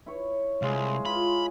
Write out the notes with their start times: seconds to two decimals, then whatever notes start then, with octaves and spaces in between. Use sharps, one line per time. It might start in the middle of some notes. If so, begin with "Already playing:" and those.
0.06 E4 C#5
0.62 C2 G#3 E4 F5
1.06 F4 B5